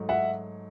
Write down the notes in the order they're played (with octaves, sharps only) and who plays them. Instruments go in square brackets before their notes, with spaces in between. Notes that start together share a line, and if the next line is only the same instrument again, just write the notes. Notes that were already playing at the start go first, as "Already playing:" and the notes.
Already playing: [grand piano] G#2 F#3 A3
[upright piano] E5 F#5